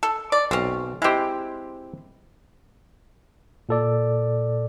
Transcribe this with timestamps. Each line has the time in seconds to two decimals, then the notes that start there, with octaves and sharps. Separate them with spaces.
0.03 A4
0.32 D5
0.51 B1 C4 C#4
1.02 G#3 C4 E4 G4
3.69 A#2 A4 D5